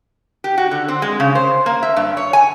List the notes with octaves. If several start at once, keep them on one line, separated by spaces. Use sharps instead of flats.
G4
F#4
D3
C4
G#3
C#3
C5
A#3
E5
G2
C#5
G#5